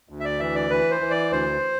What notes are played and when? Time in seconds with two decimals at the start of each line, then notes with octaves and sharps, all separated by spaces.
0.09 D2
0.20 E5
0.25 D5
0.39 E3 E5
0.55 D5
0.70 E3 B4
0.91 C5
1.01 E3
1.10 D5
1.31 D2 C5